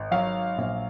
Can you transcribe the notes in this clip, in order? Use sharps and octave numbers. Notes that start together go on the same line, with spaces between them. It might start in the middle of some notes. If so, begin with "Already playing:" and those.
Already playing: G#1
F#3 F5
A#1